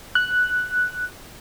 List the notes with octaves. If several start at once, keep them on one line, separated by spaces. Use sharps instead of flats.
F#6